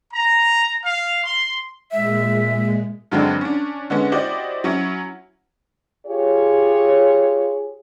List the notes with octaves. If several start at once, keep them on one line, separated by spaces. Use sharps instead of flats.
A#5
F5
C6
A#2 G#3 E5
G2 D3 F#3 G#3 C4 D4
C#4 D4
D3 G#3 B3 C#4
E4 F#4 G4 C5 D5 D#5
F#3 C#4 E4
F4 G4 G#4 C#5